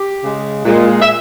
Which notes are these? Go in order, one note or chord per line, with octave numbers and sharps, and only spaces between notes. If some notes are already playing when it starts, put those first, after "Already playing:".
Already playing: G4
C#3 G#3
A#2 G#3
E5